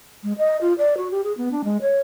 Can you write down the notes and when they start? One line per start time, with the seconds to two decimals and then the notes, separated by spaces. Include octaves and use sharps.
0.23 G#3
0.38 D#5
0.61 F4
0.78 D5
0.97 F#4
1.11 G4
1.24 G#4
1.38 B3
1.52 D4
1.64 G#3
1.82 C#5